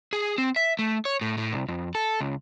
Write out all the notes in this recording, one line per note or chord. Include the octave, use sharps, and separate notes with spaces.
G#4
C4
E5
A3
C#5
A2
A2
C2
F2
A4
C#2